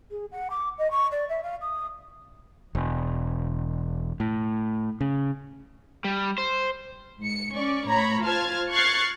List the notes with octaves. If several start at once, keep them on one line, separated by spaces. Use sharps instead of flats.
G#4
F#5
D6
D#5
C#6
D5
E5
F5
D#6
E1
A2
C#3
G3
C5
G#2 C#7
C#4 D5 C#6
A2 C#5 A#5 B5
F4 C5 A5 F6 G#6
C#6 F6 F#6 G#6 A6 C7